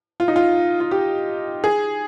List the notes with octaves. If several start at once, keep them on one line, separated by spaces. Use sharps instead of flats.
F4
D#4
F4
F4
G4
G#4